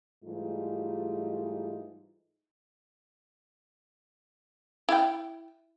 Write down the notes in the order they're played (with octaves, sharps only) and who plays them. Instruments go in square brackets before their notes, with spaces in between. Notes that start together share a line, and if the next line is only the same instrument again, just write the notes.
[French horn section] G#2 E3 G3 A3 D#4 F4
[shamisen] E4 G5